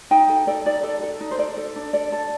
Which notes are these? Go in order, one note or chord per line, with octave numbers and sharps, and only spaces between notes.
D#4 G5
A4
A4 D5
D#4 D5
A4 D5
A4
D#4
C5
A4 D5
A4
D4
A4 D5
A4